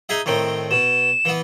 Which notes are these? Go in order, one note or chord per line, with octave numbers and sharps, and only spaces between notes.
D#4 G#4 E5
A2 D#3 C4
B2 E7
E3 B3